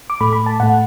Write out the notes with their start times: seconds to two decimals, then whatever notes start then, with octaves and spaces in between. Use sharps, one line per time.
0.10 D6
0.21 A2 A3 B5
0.33 B5
0.46 A5
0.60 A2 A3 F#5